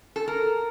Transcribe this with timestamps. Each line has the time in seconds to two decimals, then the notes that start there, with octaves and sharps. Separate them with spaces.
0.16 A4
0.28 A#4